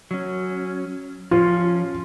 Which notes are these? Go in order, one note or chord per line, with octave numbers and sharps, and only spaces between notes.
F#3 C#4
F3 C#4 F4